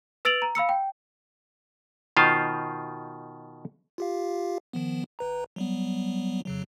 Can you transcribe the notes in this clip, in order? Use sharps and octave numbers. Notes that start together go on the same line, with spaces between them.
B4 E6 A6 D7 F7 F#7
A#5
F5 B5 E6 C#7
G5
B2 D#3 F4 C5 F5
F4 G4 F5
D#3 F3 B3
G1 B4 A#5
F#3 G3 B3
F2 C#3 F#3